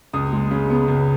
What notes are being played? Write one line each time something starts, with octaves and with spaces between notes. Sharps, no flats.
C#2 D#6
G#3
C#3
B3
C#2